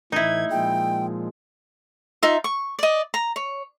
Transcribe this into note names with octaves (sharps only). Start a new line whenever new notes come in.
A2 E3 D#4 E4 G#6
A#2 F3 G#3 G5
D#4 F4 E5
C#6
D5 D#5
A#5
C#5